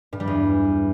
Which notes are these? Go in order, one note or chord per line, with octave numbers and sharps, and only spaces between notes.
G2
G3
E2